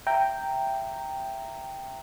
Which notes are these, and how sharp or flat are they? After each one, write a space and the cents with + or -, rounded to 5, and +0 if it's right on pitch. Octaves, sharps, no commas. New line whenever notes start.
E5 +20 G5 +0 A#5 -10